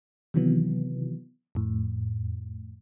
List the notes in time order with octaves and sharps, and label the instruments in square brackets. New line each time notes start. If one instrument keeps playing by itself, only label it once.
[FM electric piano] C3 D#3 E3 F#3 B3
F2 A2